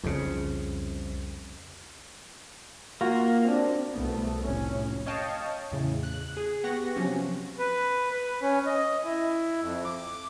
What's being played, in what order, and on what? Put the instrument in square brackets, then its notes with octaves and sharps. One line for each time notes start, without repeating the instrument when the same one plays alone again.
[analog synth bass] C2 [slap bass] F2 C#3
[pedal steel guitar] A#3 [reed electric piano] F4 F#4
[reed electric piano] C4 D4
[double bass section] C2 B2 A3 B3
F1 A2 C#4
[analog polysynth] C#5 D#5 F5 G5 A5
E2 A2 C#3
F#6
G#4
B3 G4 F#5 C#6 A#6
C3 F3 F#3 C#4
[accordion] B4
B4
C#4
D#5
E4
F2
D6